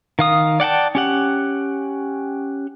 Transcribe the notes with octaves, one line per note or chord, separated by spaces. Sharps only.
D#3 F5 D#6
D5 F#5 G5 A5
C#4 G4 F#5